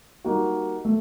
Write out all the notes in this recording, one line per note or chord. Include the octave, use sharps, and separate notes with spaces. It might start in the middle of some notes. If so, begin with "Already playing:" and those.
G3 A#3 D#4 F#4
A3